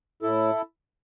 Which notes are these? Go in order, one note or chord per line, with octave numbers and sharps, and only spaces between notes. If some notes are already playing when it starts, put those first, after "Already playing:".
A2 E4 A4